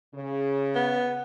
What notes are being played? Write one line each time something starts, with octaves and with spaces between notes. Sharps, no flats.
C#3
B3